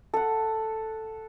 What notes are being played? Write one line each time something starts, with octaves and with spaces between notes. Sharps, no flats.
A4 F#5